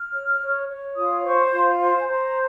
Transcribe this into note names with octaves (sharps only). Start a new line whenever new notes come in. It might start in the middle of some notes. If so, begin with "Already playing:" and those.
Already playing: F6
C#5
C#5
C#5
F4 D#6
C5 C#6
F4 C6
C5 C6
G#5
C5 A#5